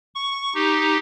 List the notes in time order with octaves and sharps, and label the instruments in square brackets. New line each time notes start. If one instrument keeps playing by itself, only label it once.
[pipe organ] C#6
D#4 G4